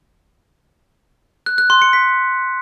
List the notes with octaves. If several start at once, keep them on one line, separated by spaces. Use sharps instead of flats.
F#6
F#6
C6
C#7
B6